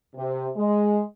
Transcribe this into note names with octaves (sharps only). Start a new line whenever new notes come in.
C3
G#3